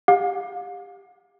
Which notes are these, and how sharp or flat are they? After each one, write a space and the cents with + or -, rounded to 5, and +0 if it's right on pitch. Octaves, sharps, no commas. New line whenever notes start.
G4 +25 F5 +40